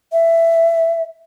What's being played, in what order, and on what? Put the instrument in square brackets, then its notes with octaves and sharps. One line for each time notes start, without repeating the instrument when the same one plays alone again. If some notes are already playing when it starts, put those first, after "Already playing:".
[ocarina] E5